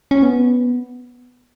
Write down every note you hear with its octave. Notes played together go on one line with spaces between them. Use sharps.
C#4
B3